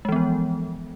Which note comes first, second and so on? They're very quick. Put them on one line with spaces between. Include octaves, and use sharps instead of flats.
G#3 E3 B3 F3